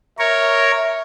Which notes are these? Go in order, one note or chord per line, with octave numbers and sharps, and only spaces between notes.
A#4 C#5 E5